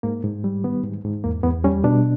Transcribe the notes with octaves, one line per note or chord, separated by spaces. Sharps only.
G#2 A#3
G#2
G3
D#3 B3
G#2
G#2
E2 A#3
E2 B3
G3 C#4
B2 D4